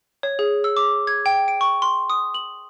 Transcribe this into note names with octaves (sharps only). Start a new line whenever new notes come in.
C#5
G#4
E6
D6
G#6
G5
D7
C#6
C6
D#6
F#7